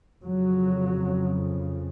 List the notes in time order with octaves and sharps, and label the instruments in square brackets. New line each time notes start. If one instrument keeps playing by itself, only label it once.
[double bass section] F2 C#3 F#3